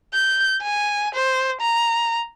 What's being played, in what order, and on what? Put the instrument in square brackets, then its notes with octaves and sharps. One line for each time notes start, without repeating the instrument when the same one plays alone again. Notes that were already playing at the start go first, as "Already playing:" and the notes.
[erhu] G6
G#5
C5
A#5